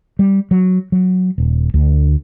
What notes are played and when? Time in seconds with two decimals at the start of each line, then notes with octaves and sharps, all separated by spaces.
0.19 G3
0.51 F#3
0.92 F#3
1.38 D#1
1.74 D2